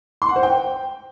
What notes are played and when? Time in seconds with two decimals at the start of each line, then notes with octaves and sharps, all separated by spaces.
0.22 C6
0.29 F#5
0.36 C5
0.43 G5